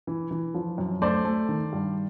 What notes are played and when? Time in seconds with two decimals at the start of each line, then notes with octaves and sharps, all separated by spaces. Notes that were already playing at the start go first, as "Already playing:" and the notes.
0.07 E3
0.31 E3
0.54 F3
0.78 F#2
1.02 A3 C5 D5
1.25 A3
1.49 D#3
1.73 G2